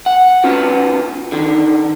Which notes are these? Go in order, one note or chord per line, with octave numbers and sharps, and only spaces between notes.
F#5
B3 C#4 F4 F#4
D3 D#3